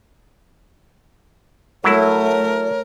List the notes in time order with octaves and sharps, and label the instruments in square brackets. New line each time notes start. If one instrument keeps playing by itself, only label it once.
[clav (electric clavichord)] F#3 E4 [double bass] A3 [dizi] A#4 [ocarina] C#5